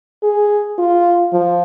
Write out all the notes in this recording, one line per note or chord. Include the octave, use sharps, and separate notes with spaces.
G#4
F4
F3